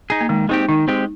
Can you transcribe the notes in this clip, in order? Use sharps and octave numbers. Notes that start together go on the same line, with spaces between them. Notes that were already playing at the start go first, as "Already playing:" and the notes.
D#4 G#4
A#3
D#3 G#3
G#3 C4 D#4 G4
D#3 D#4
G#3 C4 G4